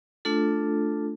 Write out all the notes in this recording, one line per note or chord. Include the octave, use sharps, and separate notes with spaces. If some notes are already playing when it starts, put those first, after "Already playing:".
A3 D4 F4 A4